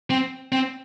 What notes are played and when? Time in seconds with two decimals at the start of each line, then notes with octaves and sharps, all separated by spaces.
0.10 C4
0.52 C4